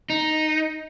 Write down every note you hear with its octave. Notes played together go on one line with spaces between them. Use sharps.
D#4